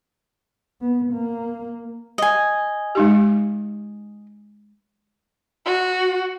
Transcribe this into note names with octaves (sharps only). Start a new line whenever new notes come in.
B3
A#3
D#5 G#5
G#3 D#4 G4
F#4